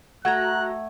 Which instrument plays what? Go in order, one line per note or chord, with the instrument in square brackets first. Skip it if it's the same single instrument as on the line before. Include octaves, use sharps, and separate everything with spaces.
[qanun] A3 [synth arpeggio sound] F#4 A#5 [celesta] F#5 G#6 [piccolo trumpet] F#6